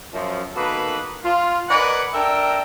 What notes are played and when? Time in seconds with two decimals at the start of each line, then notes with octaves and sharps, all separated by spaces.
0.13 F#2 F3
0.55 D#3 A#3 B3 F#4 A4 B4
1.23 F4
1.68 A#4 B4 D5 D#5 F#5 G#5
2.13 D4 A4 A#4 E5 G5